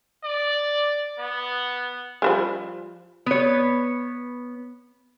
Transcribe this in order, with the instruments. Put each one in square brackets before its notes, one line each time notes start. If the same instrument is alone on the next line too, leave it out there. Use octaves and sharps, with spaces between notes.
[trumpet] D5
B3
[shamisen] F3 G3 G#3
[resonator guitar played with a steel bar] B3 C#5